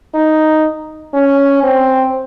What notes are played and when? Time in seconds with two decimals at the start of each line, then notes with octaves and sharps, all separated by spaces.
0.15 D#4
1.14 C#4
1.63 C4